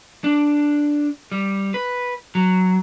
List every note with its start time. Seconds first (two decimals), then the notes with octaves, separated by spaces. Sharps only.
0.24 D4
1.32 G3
1.74 B4
2.35 F#3